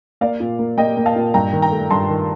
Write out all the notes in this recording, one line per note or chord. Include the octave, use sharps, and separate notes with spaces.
A#3 D5 F5
A#2
A#3
A#3 D#5 G5
A#3
F5 A5
A#2
G2 G5 A#5
D#3
G5 A#5
A3
G2 A5 C6
D#3